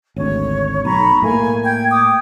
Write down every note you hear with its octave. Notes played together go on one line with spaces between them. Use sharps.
G#1 D2 C#5
B1 A#5 B5 C#6
A2 A3 A#3 G#5
G5 G#6
G5 D6 D#6